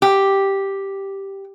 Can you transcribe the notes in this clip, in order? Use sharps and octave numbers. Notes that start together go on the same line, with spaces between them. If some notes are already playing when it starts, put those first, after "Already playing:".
G4